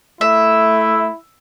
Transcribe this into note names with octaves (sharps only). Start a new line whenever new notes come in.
A3 E4 E5